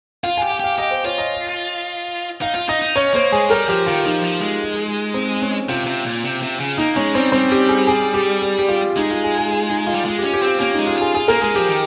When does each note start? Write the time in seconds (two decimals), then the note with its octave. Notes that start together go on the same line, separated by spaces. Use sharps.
0.23 F4 F5
0.37 G4 G#5
0.51 G5
0.60 G4 F5
0.78 G4 D#5
0.91 C5
1.05 F4 C#5
1.18 D#5
2.41 D#4 F5
2.55 F4
2.69 D#4 D#5
2.82 D#4
2.96 C#4 C#5
3.14 A#3 C5
3.32 G#3 G#4
3.50 G3 A#4
3.69 F3 G4
3.86 D#3 F4
4.06 F3 D#4
4.24 F3
4.41 G#3
5.14 C4
5.42 C#4
5.69 C3 F4
5.87 C3
6.06 A#2
6.24 C3
6.42 C3
6.60 C#3
6.78 A#3 D#4
6.96 G#3 C#4
7.15 G3 C4
7.32 G3 C4
7.51 G4
7.69 G#4
7.87 G#4
8.14 G4
8.42 G4
8.59 G4
8.68 F4
8.96 G#3 D#4
9.11 F4
9.24 G#4
9.38 G#4
9.51 G#4
9.70 D#4
9.87 F4
9.94 G3
10.05 G#3 F4
10.19 G4
10.24 C#4
10.33 G4
10.42 C4 F4
10.60 A#3 C#4
10.74 D#4
10.79 G#3
10.87 F4
10.97 F4 G#4
11.14 F4 G#4
11.28 A#3 A#4
11.41 G#3 G#4
11.56 F3 G4
11.69 D#3